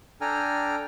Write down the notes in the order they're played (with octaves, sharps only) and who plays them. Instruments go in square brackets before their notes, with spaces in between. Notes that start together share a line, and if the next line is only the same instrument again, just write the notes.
[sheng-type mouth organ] D4 A4 G5 G#5 A#5 F6